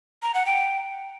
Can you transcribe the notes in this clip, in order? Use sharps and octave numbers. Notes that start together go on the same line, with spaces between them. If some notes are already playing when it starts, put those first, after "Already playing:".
A#5
F#5
G5